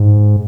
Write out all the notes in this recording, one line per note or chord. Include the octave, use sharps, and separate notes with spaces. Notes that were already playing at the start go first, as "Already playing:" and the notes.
Already playing: G#2